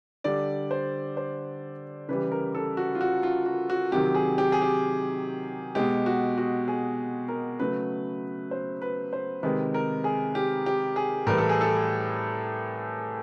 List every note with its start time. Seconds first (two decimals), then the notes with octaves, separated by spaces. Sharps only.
0.24 D3 G3 D5
0.71 C5
1.17 C5
2.09 C#3 E3 G3 B4
2.32 A#4
2.55 A4
2.77 F#4
2.95 F4
3.01 F#4
3.23 F4
3.46 F#4
3.70 F#4
3.92 C3 D#3 F#3 G4
4.15 G#4
4.38 G4
4.52 G#4
4.61 G4
5.75 B2 G#3 G4
6.06 F#4
6.38 F#4
6.68 G#4
7.28 A#4
7.59 C#3 F#3 A3 B4
8.51 C5
8.82 B4
9.13 C5
9.43 C3 D#3 G#3 B4
9.74 A#4
10.04 G#4
10.35 G4
10.66 G4
10.96 G#4
11.27 A2 E3 G3 A#4
11.38 A4
11.49 G#4
11.61 A4